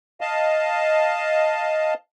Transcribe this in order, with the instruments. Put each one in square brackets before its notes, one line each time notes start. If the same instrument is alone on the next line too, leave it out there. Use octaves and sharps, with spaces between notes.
[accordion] D#5 F5 A5